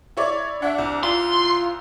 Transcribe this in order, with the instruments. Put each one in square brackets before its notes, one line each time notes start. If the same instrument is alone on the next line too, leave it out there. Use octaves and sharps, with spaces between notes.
[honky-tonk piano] E4 C#5 D5
[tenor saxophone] D4 [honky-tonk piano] E5 F#5
[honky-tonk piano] C2
[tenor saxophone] F4 [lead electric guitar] C6